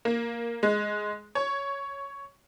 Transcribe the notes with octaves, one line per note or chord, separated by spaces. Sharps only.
A#3
G#3
C#5